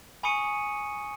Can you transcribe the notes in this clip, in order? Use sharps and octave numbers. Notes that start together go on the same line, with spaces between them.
G#5 B5 C#6 D#6 C#7 D#7